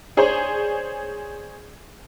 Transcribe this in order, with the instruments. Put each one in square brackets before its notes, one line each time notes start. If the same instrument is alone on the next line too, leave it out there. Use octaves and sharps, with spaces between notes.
[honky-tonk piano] D4 G#4 C5 C#5